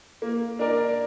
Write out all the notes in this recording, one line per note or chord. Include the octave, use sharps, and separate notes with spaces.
A#3
D4 A#4 D5